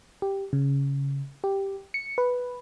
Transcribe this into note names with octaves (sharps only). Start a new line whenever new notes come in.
G4
C#3
G4
C#7
B4